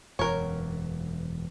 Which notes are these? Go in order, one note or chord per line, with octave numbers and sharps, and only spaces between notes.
E1 F#2 A#4 C#5